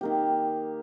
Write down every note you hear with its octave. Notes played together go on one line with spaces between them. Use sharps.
D#3 A#3 G4